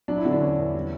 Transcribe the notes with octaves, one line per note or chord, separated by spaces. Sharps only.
F#3 D4
E4
D3 F#4
D4
E2 C#4
E2
G3